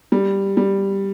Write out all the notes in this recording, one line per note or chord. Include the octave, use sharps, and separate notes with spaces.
G3
G3